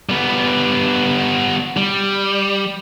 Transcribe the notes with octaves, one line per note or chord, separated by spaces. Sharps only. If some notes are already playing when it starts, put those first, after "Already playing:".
G3 B3
G3